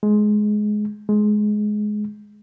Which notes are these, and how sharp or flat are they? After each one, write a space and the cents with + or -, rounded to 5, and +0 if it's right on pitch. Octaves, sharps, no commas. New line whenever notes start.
G#3 +15
G#3 +15